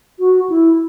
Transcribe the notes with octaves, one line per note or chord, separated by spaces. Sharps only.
F#4
E4